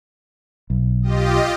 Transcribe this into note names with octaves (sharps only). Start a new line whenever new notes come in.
B1
F4 G4 D#5